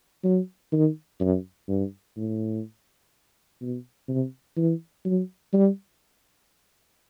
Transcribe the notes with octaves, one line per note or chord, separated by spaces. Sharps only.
F#3
D#3
F#2
G2
A2
B2
C3
E3
F#3
G3